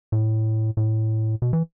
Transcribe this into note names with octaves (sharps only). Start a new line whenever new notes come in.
A2
A2
B2
E3